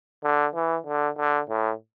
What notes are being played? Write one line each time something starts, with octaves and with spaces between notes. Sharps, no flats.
D3
E3
D3
D3
A2